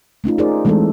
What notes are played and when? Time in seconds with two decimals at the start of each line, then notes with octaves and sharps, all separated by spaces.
0.24 A3 C#4 D#4 F4
0.38 D#4 F4 G#4 A#4 C5 D5
0.65 E3 G#3 A3 C4 D4 A4